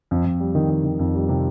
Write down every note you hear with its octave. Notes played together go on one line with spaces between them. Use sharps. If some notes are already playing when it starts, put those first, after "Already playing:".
F2
F2
G3
D#3
D#3
D#3
F2
G3
C3